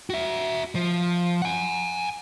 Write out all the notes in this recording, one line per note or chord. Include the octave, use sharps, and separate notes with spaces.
F#4 E5
F3
F#5 G#5